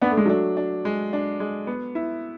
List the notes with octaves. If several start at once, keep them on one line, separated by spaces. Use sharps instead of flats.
B3 D4
A3
G#3
F#3 A3 D4
D4
G#3
D4
G#3
B3
E4